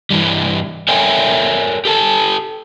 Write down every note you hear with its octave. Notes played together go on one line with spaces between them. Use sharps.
G2 E3 G3
A4 A#4 C#5 E5 G5 G#5
G4 A4 A5